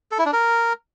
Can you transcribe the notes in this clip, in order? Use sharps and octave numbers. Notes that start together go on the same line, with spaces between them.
A4
E4
D4
A#4